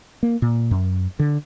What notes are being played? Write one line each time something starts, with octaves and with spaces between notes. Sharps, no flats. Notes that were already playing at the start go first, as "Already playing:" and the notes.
A#3
A#2
F#2
D3